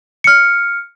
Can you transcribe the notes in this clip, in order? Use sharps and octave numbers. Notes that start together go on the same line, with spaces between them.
F6 C#7